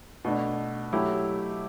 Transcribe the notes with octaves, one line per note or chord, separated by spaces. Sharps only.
B2 A3 D4
F#3 A3 E4 G4